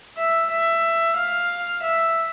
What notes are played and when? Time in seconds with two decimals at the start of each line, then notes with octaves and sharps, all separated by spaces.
0.17 E5
0.50 E5
1.17 F5
1.82 E5